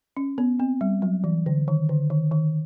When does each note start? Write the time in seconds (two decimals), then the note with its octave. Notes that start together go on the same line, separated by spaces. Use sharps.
0.17 C#4
0.38 B3
0.60 C4
0.81 G3
1.02 F#3
1.24 E3
1.46 D3
1.68 D#3
1.89 D3
2.10 D#3
2.32 D#3